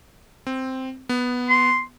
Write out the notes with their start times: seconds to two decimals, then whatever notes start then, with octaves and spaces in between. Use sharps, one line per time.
0.47 C4
1.09 B3
1.49 C6